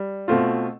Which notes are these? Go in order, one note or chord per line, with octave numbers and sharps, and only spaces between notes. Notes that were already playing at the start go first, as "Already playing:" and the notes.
Already playing: G3
B2 A3 C4 F4